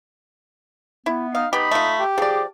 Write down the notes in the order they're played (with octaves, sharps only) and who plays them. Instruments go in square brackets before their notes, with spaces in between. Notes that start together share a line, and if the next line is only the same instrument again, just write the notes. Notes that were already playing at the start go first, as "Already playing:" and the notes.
[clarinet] B3 [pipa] E4
[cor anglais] D#4 [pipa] F5
[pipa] B3 G4 [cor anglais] D#4 [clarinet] B5
[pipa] A3 F4
[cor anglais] G4
[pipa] F3 D5 [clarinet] G#4